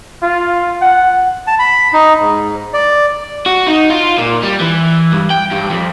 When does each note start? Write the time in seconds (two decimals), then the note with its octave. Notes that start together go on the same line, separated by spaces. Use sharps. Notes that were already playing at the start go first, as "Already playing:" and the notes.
0.23 F4
0.82 F#5
1.47 A5
1.59 B5
1.93 D#4
2.20 G#2
2.74 D5
3.46 F#4
3.67 D#4
3.90 F4
4.18 A#2
4.43 G3
4.60 E3
5.12 G2
5.30 G5
5.51 G2
5.70 F2